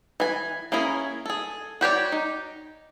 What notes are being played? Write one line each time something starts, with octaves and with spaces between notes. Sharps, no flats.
E3 G#5
A#3 C#4 E4 G#4 A#4
G#4 A4
F#4 G4 C#5 D5
D#4